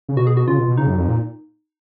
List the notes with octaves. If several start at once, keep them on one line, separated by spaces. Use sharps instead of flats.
C#3
B2 F#4
G#4
F#4
C#3 F4
B2
B2
C#3 D#4
F#2
F2
A#2